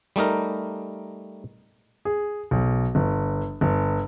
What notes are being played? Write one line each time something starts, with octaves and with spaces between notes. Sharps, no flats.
G3 A3 D#4 A#4
G#4
B1
G1
G1